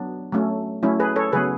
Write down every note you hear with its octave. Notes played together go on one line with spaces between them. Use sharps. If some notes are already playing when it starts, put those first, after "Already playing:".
Already playing: F#3 B3 D4
F#3 A3 C#4
F#3 A3 C#4 E4
G#4 B4
A4 C#5
C#3 F#3 B3 G#4 B4